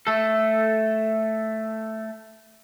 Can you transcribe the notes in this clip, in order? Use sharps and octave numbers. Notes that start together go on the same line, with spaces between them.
A3 A4